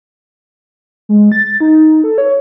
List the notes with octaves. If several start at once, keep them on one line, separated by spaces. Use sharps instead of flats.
G#3
A6
D#4
A4
C#5